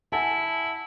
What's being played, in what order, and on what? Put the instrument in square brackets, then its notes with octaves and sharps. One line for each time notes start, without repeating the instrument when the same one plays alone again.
[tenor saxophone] E4 [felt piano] F#5 G#5 A5